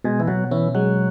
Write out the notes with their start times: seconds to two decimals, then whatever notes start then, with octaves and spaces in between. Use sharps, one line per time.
0.04 B2 G#3
0.20 E3
0.28 B2 F#3
0.51 E3 C#4
0.75 F#3 G#3